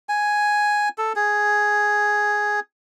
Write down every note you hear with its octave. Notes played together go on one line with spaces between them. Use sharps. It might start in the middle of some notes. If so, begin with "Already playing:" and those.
G#5
A4
G#4